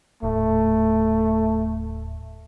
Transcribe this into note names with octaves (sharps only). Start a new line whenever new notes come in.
D#1 A2 A3